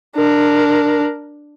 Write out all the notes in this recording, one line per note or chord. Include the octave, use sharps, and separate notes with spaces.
D4 A#4